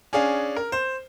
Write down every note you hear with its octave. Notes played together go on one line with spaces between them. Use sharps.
C#4 D4 G#4 F5
A#4
C5